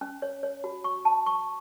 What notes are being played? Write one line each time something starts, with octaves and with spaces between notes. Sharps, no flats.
C#4
C#5
C#5
F#4
C#6
A5
C#6